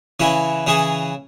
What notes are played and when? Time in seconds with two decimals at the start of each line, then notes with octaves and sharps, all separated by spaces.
0.20 C#3 E3 C#4 E4
0.67 C#3 E3 C#4 G#4